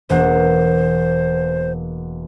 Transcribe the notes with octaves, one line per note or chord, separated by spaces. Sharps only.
E1 A#3 C5 F#5